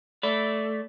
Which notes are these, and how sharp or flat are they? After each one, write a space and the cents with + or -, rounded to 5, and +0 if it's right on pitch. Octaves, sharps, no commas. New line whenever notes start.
A3 -5 D5 -15 B5 +0